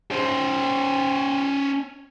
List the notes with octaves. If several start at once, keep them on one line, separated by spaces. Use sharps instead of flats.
C#4 C5